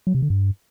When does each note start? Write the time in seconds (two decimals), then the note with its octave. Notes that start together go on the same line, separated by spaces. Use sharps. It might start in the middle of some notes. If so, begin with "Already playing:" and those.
0.07 F#3
0.15 C3
0.22 D3
0.30 G2